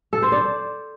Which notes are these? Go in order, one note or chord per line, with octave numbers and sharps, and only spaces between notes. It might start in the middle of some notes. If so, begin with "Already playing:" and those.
A4
C5
D5